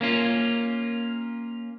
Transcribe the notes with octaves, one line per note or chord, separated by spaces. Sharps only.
A#3 C#4 F4